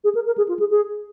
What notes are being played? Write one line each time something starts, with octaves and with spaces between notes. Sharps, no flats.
G#4
A#4
A#4
G#4
F4
G#4
G#4